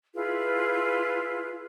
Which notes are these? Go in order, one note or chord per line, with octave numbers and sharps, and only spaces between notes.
E4 F4 G#4 B4